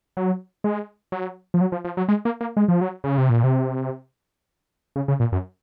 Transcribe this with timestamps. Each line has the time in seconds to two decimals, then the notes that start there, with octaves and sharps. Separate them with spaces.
0.17 F#3
0.64 G#3
1.12 F#3
1.54 F3
1.61 F#3
1.72 F3
1.85 F3
1.97 F#3
2.08 G#3
2.25 A#3
2.41 A#3
2.57 G#3
2.68 F3
2.81 F#3
3.04 C#3
3.18 C3
3.30 A#2
3.44 C3
4.96 C#3
5.08 C#3
5.20 A#2
5.32 F#2